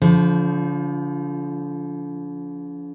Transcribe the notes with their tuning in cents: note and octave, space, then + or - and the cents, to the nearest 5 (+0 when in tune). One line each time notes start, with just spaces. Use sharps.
D3 -45 F3 -10